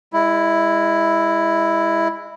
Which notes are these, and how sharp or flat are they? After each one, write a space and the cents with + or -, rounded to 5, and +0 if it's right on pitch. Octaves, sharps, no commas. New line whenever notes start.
G#3 -30 E4 +0